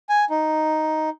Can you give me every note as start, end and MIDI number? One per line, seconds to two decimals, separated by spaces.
0.09 0.25 80
0.30 1.10 63